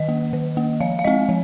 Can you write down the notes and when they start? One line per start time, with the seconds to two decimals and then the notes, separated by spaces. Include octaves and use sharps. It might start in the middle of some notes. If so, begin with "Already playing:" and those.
Already playing: D#3 D#5
0.09 A#3
0.33 D#3
0.57 A#3
0.80 F3 F5
0.99 F5
1.04 G#3 C4 D#5
1.29 F3